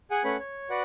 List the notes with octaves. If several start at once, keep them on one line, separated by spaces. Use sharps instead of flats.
G#4 F#5 G#5
A3 C#4 B4 C#5 F#5 B5
C#5
F#4 B4 D5 F#5